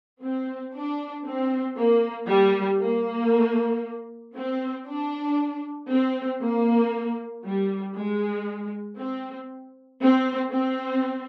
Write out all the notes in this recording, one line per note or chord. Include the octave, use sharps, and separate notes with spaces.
C4
D4
C4
A#3
G3
A#3
C4
D4
C4
A#3
G3
G#3
C4
C4
C4